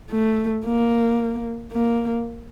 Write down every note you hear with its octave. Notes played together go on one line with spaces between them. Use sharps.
A3
A#3
A#3